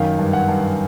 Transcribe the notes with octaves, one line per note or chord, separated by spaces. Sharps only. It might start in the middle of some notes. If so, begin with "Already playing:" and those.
Already playing: F#2 D#3 F5
G2
F#5
G2